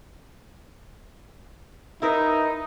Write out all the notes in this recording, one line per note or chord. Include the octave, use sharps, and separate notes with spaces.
D#4 E4 A#4 B4